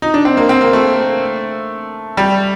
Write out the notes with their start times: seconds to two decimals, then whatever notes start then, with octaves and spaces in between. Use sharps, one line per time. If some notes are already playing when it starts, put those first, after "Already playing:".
0.02 D#4
0.14 D4
0.25 C4
0.37 A#3
0.49 C4
0.61 A#3
0.73 A3
2.17 G3